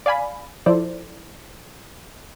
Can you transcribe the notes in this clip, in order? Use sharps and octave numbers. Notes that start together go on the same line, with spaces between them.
D5 F5 G#5 B5
F3 E4 A4 C5 D5